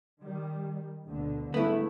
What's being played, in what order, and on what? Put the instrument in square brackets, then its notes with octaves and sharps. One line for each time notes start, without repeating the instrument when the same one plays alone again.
[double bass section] D#3 G3
D2 B2 D3
[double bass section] G1 G#2 [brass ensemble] A3 [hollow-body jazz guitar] B3 E4